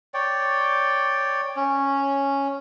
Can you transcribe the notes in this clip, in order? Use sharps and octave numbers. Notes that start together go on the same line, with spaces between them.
C#5 D5 G5
C#4